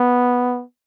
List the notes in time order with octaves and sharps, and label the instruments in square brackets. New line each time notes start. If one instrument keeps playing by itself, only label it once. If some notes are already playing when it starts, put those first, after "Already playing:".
Already playing: [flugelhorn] B3